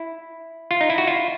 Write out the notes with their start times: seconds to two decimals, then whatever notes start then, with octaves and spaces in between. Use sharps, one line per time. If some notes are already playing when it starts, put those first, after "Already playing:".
Already playing: E4
0.71 F4
0.81 D#4
0.90 E4
0.98 F#4
1.07 F4